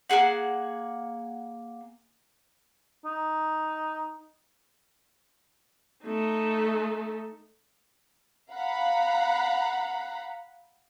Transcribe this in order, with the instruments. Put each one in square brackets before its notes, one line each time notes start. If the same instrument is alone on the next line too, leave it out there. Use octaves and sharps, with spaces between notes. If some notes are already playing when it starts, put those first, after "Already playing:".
[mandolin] A#3 F4 G#4 F#5
[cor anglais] D#4
[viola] A3 D#4
[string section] F5 F#5 A#5 B5